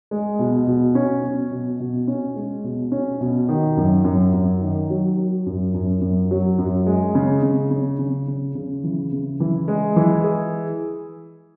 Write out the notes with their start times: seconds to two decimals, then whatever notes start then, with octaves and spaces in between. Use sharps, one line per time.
0.11 G#3
0.39 B2
0.67 B2
0.95 C#4
1.23 B2
1.51 B2
1.80 B2
2.08 C#4
2.36 G#3
2.64 B2
2.92 C#4
3.21 B2
3.49 D#3
3.77 F#2
4.04 F#2
4.34 F#2
4.61 D#3
4.90 F#3
5.18 F#3
5.46 F#2
5.74 F#2
6.01 F#2
6.31 F#3
6.58 F#2
6.86 G#3
7.15 C#3
7.43 C#3
7.71 C#3
7.99 C#3
8.28 C#3
8.55 C#3
8.84 E3
9.12 C#3
9.40 E3
9.68 G#3
9.96 E3
10.24 G#4